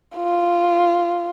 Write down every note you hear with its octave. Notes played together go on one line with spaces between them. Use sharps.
F4